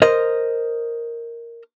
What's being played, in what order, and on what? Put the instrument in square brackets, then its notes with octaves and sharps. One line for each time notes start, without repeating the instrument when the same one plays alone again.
[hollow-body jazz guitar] A#4 C5 D#5